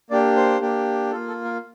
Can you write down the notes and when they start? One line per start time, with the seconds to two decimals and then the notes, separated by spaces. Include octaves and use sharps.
0.11 A#3 D4 G4 D5
0.36 C5
0.61 A#3 D4 G4
1.11 A#3 F4 A4
1.28 A4
1.45 A#4